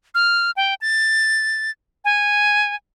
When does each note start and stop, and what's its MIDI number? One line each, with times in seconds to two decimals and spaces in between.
0.15 0.51 89
0.57 0.74 79
0.81 1.71 93
2.05 2.75 80